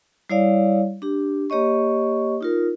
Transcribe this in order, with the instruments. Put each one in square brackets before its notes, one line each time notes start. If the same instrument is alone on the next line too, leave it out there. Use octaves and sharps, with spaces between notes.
[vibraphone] G3 E4 C#5 D5 F5
D4 G4
A#3 G4 C#5 D#5 C#6
D#4 F4 A#4